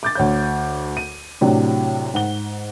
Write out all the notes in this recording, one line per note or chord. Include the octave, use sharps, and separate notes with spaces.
D6 G6 A6
D2 C#5 G6
D#7
A2 C3 F#3 D4
G#2 F#5 G7